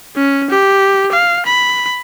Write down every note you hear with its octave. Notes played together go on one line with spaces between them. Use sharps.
C#4
G4
F5
B5